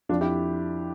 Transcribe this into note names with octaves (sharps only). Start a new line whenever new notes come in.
F2 D4 F4
E4 G4